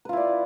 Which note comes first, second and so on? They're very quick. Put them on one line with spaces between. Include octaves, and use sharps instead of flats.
B4 F4 E4 D5